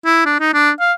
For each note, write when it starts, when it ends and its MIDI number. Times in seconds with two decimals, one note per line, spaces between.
0.05 0.25 64
0.25 0.39 62
0.40 0.53 63
0.53 0.71 62
0.80 0.93 77